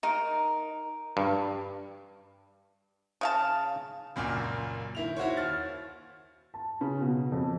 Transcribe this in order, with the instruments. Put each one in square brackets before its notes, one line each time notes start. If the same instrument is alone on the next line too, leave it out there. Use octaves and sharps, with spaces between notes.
[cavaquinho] D#4 A#4
[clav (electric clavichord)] G2
[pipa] C#3 F5 A5
[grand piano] C#2 F#2 A#2 A#3
D#3 E4 F7
E4 F#4 C5 C#5
D#2 F6 A6
[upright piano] A5
C#3
B2
F2